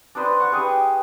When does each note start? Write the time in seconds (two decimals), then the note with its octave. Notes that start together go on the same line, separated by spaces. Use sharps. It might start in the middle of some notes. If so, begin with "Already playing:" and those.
0.15 D4 D#4 B4 C5
0.39 F#5 C#6
0.52 D#4 G4 G#4 B4